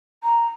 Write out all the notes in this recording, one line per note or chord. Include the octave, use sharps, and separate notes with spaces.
A#5